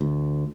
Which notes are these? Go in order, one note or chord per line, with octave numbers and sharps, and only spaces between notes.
D2